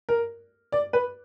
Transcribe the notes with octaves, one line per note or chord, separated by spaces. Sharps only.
A#4
D5
B4